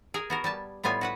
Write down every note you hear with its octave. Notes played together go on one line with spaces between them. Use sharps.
G#4 A#4 G#5 A#5
B3 F#4 A#4
G3 G#5 A5
A2 G3 B3 F4 G#5
F#4 B4 F#5